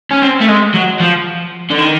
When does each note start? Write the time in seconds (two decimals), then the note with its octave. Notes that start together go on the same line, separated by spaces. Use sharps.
0.11 C#4
0.22 C4
0.40 A3
0.48 G#3
0.74 F#3
1.00 F3
1.70 D3
1.78 D#3